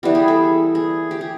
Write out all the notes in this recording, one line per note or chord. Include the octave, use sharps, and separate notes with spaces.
E3 G3 B3 G4
G#4
A4
G#4
G4
G#4